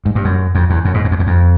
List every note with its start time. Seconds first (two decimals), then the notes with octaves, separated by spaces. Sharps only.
0.06 G#2
0.15 G2
0.25 F#2
0.55 F2
0.70 E2
0.85 F#2
0.94 G#2
1.04 F#2
1.11 F2
1.19 E2
1.27 F2